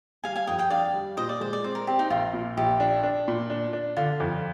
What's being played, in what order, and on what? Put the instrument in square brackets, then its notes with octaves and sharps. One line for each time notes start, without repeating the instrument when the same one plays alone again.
[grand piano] G3 [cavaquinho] F5 G#5
[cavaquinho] F5 G#5
[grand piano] F2 [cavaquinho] D#5 G5
[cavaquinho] D#5 G5
[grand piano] D4 [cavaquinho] D5 F5
[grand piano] G3
[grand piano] A#2 [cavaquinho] C5 D#5
[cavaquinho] D5
[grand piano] G#3 [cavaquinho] C5
[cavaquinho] D5
[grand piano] C4 [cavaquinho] C5
[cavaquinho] A#4
[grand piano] C4 [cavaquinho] G4
[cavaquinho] D#4
[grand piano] A#1 [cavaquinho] F4
[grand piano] A#2
[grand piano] A#1 [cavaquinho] G4
[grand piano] D4
D4
A#2
D4
D4
[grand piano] D3 [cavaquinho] F4
[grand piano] F2